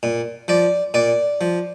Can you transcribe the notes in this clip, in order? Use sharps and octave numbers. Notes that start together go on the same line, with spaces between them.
A#2
F3 D5
A#2 D5
F3